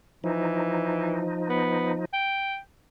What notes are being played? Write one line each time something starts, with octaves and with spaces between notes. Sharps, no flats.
E3 F3 D#4
B3
G5